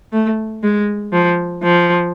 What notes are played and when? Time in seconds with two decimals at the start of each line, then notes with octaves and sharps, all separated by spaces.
0.13 A3
0.63 G#3
1.12 F3
1.63 F3